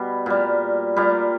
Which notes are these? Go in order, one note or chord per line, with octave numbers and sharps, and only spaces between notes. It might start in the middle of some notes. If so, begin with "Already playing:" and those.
Already playing: B2 G3
A#2 G3
A#2 G3